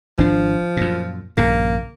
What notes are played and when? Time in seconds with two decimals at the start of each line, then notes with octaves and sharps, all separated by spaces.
0.18 G#1 F3 D4
0.77 F#2 A#2
1.37 A#1 G2 C#3 A#3